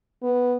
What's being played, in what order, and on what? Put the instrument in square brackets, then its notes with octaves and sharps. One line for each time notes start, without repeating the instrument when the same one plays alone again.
[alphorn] B3